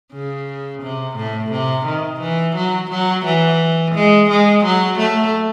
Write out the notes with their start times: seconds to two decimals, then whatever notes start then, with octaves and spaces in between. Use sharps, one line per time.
0.12 C#3
0.82 C3
1.16 A2
1.51 C3
1.85 D#3
2.20 E3
2.55 F#3
2.90 F#3
3.25 E3
3.95 G#3
4.29 G#3
4.64 F#3
4.98 A3